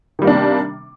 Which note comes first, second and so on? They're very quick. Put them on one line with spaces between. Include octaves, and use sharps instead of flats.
D#3 G3 A#3 D4 C3